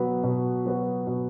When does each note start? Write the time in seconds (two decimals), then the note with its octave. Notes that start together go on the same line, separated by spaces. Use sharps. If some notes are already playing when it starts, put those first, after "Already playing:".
Already playing: B2 F#3 B3 F#4 B4
0.23 B2
0.65 F#3 B3 F#4 B4
1.07 B2